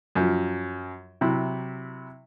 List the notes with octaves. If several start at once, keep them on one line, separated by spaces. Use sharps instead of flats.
F#2 F3
C3 F#3 E4